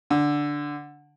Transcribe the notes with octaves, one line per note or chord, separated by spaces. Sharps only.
D3